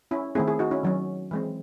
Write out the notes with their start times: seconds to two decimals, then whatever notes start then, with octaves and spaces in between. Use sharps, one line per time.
0.11 C#4 E4
0.35 D#3 A3 C4 E4 G#4
0.47 E4 G#4
0.59 D#4 F#4
0.71 C#4 E4
0.83 D#3 F#3 C#4
1.31 E3 G#3 C4